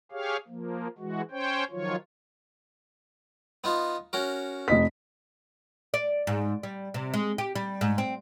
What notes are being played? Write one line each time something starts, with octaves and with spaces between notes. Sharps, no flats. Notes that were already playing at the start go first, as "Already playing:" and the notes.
G4 G#4 C#5 F5
F3 A#3
E3 G#3 F#4
C#4 C5 C#5 G5
D#3 F3 F#3 F4 C#5
B3 D#4 F4
C#4 F#4 A#4
F1 D#5 B6
D5
G#2
G3
C3
G#3
G4
G3
G#2
C4